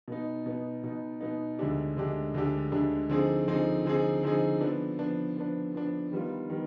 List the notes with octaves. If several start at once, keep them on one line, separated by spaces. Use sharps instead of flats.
B2 B3 D#4
B2 B3 D#4
B2 B3 D#4
B2 B3 D#4
D2 D3 G#3 D4 G4
D2 D3 G#3 D4 G4
D2 D3 G#3 D4 G4
D2 D3 G#3 D4 G4
D3 F3 C4 D#4 G#4
D3 F3 C4 D#4 G#4
D3 F3 C4 D#4 G#4
D3 F3 C4 D#4 G#4
F3 B3 D4
F3 B3 D4
F3 B3 D4
F3 B3 D4
D#3 G3 B3 F4
D#3 G3 B3